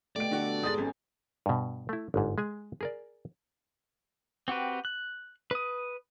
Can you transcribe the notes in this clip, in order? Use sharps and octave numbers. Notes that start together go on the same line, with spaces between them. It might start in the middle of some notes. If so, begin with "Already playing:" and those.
B2 A3 G4 D5 D7
D3 F#4 A4 G5 A5
G#2 G#3 D#6 A6
G#1 C#4 G#4
G2 B2
A3 E4
G1 G#2
G#3 G#4 G#5
G#4 A#4 D5
C4 F#4 G4 B4
F#6
B4 D#6